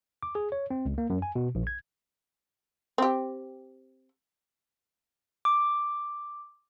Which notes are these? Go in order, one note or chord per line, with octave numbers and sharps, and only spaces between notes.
D6
G#4
C#5
C4
C#2
A#3
F#2
G#5
B2
A#1
G#6
C4 G4
D6